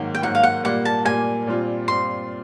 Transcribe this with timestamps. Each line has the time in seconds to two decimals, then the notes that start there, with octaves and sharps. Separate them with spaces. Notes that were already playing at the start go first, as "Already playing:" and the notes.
Already playing: G#2 D#3 F#3 A#3
0.15 G5
0.22 G#2 D#3 F#3 A#3 F#5
0.35 F5
0.43 F#5
0.64 A#2 G3 A#3 F#5
0.85 A5
1.05 A#2 G3 A#3 G#5
1.47 A#2 G3 C4 F4
1.88 A#2 G3 C4 F4 C6